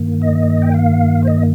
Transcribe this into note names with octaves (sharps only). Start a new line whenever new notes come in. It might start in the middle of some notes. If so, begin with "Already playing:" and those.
Already playing: G2 D#3 A#3
D#5
G5
F5
C5
D#5